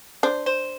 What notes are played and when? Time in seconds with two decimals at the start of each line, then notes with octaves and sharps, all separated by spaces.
0.23 D4 C5
0.46 C5